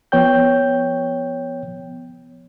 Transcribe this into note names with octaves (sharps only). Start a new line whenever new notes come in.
F3 B3 C#5 G5 G6